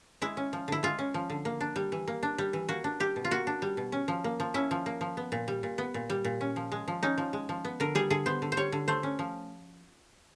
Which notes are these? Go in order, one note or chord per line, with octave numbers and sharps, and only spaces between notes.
G#3 E4
C#4
F3
D3 E4
G#3 F4
C#4
F3
D3
A#3
D4
G3
E3
A#3
D4
G3
E3
A#3 F#4
D4
G3 G4
B2
F4
A#3 F#4
D4
G3
B2
C#4
F3
A#3
F3
C#4 E4
F3
A#3
F3
B3
A#2
G3
A#2
B3
A#2
G3
A#2
C#4
F3
G#3
F3
C#4 D#4
F3
G#3
F3
B3
D3 A#4
G3 G#4
D3 G#4
B3 C5
D3
C5
G3 C#5
D3
A3 C5
C#4
F3